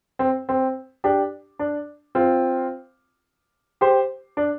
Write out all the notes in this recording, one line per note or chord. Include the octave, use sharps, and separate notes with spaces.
C4
C4
D4 G4
D4
C4 F4
G4 C5
D4